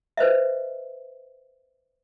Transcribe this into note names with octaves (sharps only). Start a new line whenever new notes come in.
B4 C5 D#5 E5